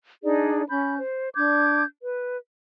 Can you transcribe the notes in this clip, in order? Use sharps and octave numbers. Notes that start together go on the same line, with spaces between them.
D4 D#4 G#4 D5
C#4 B5 G6
C5
D4 D6 G6 G#6
B4